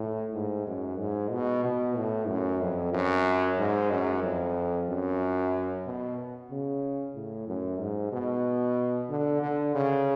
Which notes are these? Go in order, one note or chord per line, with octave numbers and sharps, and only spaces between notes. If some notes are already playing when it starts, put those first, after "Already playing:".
Already playing: A2
G#2
F#2
G#2
B2
B2
A2
F#2
F2
F#2
G#2
F#2
F2
F#2
B2
C#3
A2
F#2
G#2
B2
D3
D3
C#3